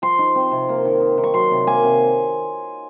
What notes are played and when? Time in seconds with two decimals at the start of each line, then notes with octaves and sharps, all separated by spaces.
0.02 F3 C6
0.19 D#4
0.35 C4
0.52 C3
0.69 A#3
0.85 D#3
1.01 D#4
1.18 D#3
1.24 C#6
1.34 F#3 C6
1.51 C3
1.67 A#3 G#5
1.84 C3